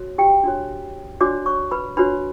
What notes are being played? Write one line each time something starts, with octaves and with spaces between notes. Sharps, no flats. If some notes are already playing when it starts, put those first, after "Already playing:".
Already playing: F#4 C#5
G4 G5
D4 F#4 C#5
D4 F#4 C#5 D5 D6
C#5 C#6
B4 B5
D4 F#4 B4 C#5 B5